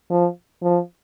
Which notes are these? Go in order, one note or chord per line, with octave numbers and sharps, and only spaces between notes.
F3
F3